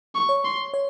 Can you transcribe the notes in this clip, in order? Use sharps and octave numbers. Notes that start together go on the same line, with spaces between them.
C#6
C#5
C6
C#5